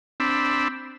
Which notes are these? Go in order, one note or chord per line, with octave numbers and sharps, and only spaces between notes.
C4 D4 B5 E6